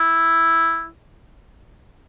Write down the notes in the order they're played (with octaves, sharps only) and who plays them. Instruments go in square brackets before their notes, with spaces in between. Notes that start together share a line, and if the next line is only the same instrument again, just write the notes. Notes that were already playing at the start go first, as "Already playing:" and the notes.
Already playing: [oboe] E4